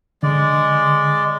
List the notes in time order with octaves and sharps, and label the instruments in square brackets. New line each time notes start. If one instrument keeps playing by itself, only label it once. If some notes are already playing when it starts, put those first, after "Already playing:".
[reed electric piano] D3 [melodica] G#3 D5